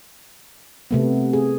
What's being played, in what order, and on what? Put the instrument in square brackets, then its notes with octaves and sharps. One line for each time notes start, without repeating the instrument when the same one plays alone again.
[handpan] C3 A3 B3
G#4